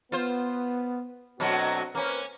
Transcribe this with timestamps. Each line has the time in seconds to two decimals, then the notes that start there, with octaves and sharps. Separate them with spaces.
0.12 B3 F4 C5
1.40 B2 F#3 A3 C4 D4 F#4
1.95 A#3 C4 C#4 B4